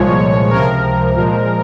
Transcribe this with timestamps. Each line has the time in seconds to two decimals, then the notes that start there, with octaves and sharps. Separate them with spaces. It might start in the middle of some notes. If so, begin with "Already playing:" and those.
Already playing: C2 A#2 F3 G#3 C#5
0.50 C#2 C3 F3 A#4
1.15 A#2 F3 G#3